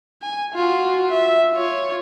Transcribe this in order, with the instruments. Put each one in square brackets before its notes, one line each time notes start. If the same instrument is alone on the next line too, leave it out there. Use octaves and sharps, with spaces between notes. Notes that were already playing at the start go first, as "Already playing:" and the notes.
[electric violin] G#5
F4 F#4
E5
F4 C#5